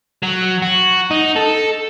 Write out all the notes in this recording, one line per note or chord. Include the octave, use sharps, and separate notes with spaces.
F#3
F#4
D#4
A4